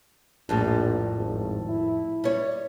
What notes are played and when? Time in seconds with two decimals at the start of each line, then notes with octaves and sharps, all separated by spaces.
0.49 A#1 F2 A2 G3
1.15 G#1
1.69 E4
2.24 G3 C#5